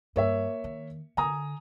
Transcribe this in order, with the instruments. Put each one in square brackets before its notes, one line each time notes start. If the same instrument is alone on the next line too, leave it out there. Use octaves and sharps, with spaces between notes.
[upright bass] G2 [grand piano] A#3 C#5 E5
[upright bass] D#3
[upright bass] D3 [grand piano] G#5 A#5 D#6